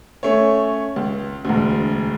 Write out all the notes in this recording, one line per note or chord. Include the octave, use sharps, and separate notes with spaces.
A3 C#4 C#5
C#2
E1 D2